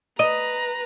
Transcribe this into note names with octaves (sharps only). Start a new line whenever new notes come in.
B4 D#5 A#5